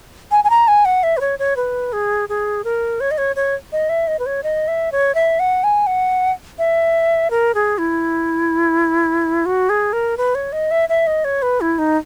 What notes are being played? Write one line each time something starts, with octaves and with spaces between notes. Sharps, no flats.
G#5
G#5
A#5
G#5
F#5
E5
B4
C#5
C#5
B4
G#4
G#4
A#4
C#5
D#5
C#5
C#5
D#5
E5
D#5
B4
C#5
D#5
E5
C#5
E5
F#5
G#5
F#5
E5
A#4
G#4
E4
F#4
G#4
A#4
B4
C#5
D#5
E5
E5
D#5
C#5
B4
E4
D#4